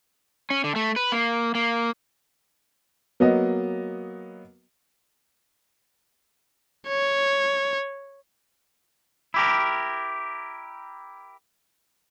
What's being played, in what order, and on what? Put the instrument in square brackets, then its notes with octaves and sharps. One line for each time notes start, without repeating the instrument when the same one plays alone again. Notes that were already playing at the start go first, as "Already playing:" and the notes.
[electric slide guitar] C#4
D3
A3
B4
A#3
A#3
[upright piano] F#3 A#3 B3 D#5
[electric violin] C#5
[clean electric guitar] E4 G4 A#4